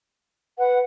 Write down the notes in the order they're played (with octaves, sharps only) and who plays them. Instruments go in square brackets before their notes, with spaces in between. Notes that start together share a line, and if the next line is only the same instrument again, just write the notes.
[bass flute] B4 [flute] F#5